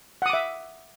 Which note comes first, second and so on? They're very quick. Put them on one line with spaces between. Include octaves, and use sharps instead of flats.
F#5 D#6 D6 E5